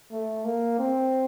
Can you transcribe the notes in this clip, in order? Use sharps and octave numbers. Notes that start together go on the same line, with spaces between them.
A3
A#3
C4